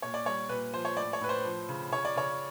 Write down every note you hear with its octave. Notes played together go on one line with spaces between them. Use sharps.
A#2 C#5
D5
G3 C#5
A#2 B4
F3 C5
C#5
A2 D5
C#5
A2 B4
C5
F3
C#3
C#3 C#5
D5
C#3 C#5